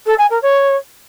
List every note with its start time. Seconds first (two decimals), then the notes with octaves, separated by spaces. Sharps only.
0.06 A4
0.18 G#5
0.30 A#4
0.42 C#5